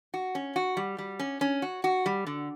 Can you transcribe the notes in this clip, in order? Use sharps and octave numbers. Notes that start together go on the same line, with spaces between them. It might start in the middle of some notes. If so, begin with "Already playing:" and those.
F#4
C#4
F#4
G3
G3
C#4
C#4
F#4
F#4
G3
D3